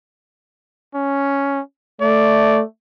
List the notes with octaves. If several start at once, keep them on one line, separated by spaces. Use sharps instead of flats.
C#4
A3 D5